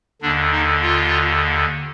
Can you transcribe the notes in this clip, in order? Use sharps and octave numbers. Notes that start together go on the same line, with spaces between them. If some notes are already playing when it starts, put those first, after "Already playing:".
D#2 D3 D4
D#4
F4